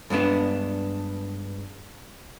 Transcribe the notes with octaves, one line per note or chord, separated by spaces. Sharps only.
G2 G#3 B3 D4 B4